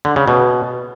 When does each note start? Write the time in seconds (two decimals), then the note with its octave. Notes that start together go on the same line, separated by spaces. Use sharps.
0.05 D3
0.16 C#3
0.28 B2